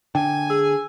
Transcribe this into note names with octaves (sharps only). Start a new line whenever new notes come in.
D3 G5 G#5
G#4 E6